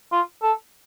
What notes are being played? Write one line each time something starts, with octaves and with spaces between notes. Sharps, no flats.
F4
A4